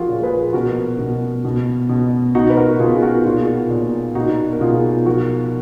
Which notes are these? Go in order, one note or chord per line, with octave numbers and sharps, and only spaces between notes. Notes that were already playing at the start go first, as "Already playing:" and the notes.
Already playing: F3 F4 F#4 G#4 A#4
A#2
G#4 B4
B2 F#4 A#4
B2
B2
B2
B2 D#4 F#4
B4
F#4 A#4
B2 F4 G#4
F#4 A#4
A#2 F4 G#4
A#2
B2 D#4 F#4
A#4
B2 F4 G#4
F3 F#4 A#4